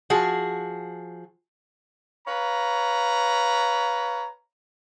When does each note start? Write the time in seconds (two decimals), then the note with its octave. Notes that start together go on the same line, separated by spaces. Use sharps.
0.10 F3 F#4 G#4
2.28 B4 C#5 F5 A#5